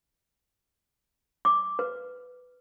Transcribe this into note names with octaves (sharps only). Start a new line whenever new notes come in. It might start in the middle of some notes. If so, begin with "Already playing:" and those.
D6
B4